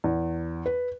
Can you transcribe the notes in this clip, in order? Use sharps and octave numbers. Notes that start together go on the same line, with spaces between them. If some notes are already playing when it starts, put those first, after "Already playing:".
E2
B4